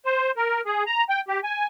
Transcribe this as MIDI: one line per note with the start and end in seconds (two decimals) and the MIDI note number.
0.06 0.31 72
0.37 0.61 70
0.66 0.84 68
0.86 1.04 82
1.09 1.21 79
1.28 1.40 67
1.44 1.67 80